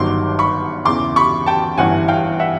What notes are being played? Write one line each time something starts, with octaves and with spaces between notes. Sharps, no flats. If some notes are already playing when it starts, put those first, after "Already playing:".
Already playing: G1 G2 D#3 F#3 C6 D6
B5 C#6
E2 C#3 E3 C6 D6
B5 C#6
G5 A5
G1 G2 E3 F#5 G#5
F5 G5
E5 F#5